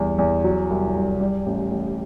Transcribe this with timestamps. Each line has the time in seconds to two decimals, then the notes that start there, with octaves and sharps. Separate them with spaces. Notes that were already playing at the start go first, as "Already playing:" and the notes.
Already playing: E2 G3
0.18 E2
0.44 F#3
0.70 C2
0.95 C2
1.21 G3
1.46 A1
1.71 A1